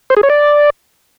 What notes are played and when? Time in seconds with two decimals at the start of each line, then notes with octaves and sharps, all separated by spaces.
0.10 C5
0.17 G#4
0.23 C#5
0.30 D5